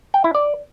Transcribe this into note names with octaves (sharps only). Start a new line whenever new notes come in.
G5
E4
D5